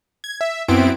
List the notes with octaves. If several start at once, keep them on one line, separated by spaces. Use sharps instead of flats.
G#6
E5
F#2 B3 C4 E4 D7